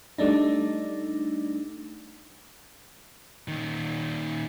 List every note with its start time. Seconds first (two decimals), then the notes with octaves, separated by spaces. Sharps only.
0.18 G3 A3 D4 D#4
3.48 A#2 D#3